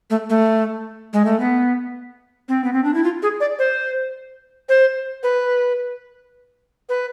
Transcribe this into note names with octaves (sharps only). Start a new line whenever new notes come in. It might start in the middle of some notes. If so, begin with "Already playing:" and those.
A3
A3
G#3
A3
B3
C4
B3
C4
D4
E4
F4
G#4
D5
C5
C5
B4
B4